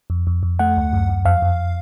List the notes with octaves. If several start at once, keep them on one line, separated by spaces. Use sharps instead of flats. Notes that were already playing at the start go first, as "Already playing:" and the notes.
F2
F2
F2
A3 F#5
D2
F#2
F#2
F2 F5
F2